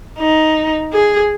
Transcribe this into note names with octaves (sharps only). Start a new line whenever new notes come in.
D#4
G#4